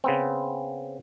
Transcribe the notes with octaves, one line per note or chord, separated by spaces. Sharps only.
C#3 B3 C4